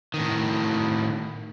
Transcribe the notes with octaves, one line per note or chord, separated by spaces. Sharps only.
A2 D#3